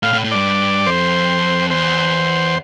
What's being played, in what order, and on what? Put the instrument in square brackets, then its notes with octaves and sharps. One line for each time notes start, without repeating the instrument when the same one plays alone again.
[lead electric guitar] A2 [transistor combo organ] F5
[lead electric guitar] A2
A2
[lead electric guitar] G2 [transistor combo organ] D5
[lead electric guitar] F2 [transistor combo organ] C5
[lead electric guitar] E2 [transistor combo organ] C5